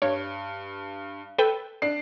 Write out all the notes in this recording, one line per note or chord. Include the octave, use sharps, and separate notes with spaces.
G2 C#5
A4 B4 G5
D4 C7